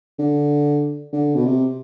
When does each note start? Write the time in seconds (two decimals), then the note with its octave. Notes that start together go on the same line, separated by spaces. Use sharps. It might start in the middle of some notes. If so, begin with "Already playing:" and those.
0.19 D3
1.13 D3
1.35 B2
1.44 C3